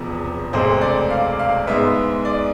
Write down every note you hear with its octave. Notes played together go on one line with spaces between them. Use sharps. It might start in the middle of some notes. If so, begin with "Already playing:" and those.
Already playing: E1 E2 C3 F3 B3
E1 D2 C3 G#3 C5
D5
F5
F5
G#2 G#3 B3 E5
D5